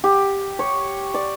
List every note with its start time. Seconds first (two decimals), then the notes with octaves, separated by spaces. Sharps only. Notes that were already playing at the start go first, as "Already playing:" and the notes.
0.04 G4
0.59 C#5
1.14 D5